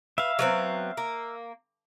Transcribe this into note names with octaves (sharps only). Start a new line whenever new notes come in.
B4 E5 F5
F#3 B3 C4
A#3